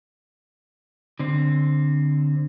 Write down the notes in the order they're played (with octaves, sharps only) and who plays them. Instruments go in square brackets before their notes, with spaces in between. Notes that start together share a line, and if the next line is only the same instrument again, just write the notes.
[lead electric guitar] D3 C4